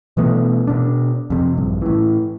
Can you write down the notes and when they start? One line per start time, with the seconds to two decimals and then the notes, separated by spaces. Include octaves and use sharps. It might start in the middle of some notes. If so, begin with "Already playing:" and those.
0.17 B2 E3 A3 B3
0.67 B2 D4
1.30 F2 C3
1.57 A#1 G2
1.82 A2 E3